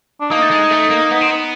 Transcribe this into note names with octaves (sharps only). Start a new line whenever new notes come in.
D4
A#3 D#4
A3
G#3
A3
A#3
B3
C4
B3